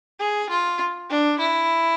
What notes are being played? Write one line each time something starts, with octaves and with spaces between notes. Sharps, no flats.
G#4
F4
D4
E4